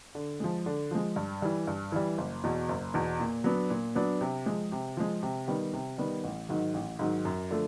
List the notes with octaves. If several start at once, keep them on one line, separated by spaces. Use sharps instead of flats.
D3
F3 G#3
D3
F3 G#3
G2
E3 G3
G2
E3 G3
F#1
E2 B2
F#1
E2 B2
A#2
F#3 B3 D4
A#2
F#3 B3 D4
C3
F3 G#3
C3
F3 G#3
C3
D#3 G3 B3
C3
D#3 G3 B3
A1
G#2 D#3 F#3
A1
G#2 D#3 F#3
F#2
D3 F3 A3